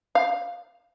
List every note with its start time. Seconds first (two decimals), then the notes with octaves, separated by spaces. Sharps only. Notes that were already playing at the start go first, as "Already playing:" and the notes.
0.15 F5